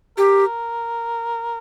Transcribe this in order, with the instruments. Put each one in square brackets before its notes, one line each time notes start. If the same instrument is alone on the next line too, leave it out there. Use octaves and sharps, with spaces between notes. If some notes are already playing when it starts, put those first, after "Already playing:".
[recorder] G4 [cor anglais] A#4